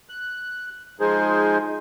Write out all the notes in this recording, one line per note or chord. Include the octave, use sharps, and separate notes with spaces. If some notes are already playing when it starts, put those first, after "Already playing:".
F#6
F3 G#3 D#4 G#4 C5